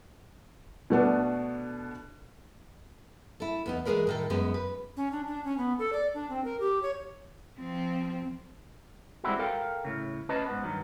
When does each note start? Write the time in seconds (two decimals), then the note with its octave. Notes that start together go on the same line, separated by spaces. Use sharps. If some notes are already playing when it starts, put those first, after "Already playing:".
0.90 B2 A3 B3 D4
3.40 E4 A4
3.66 E2 B3 D#4
3.85 E3 G#3 C4 G#4 A#4 B4
4.07 A2 D#3 A4
4.30 F#2 G#3 B3
4.54 B4
4.97 C#4
5.12 D4
5.27 D4
5.44 C#4
5.58 B3
5.79 A4
5.93 D5
6.14 D4
6.30 C4
6.44 A#4
6.60 G4
6.82 C#5
7.59 F3 C4
9.24 G3 G#3 C4 D#4 E4 F#4
9.39 A4 A#4 F5 G5
9.85 A2 C#3
10.29 C#4 B4 D#5 A5
10.46 G#2 B3
10.63 G2 D#3 F#3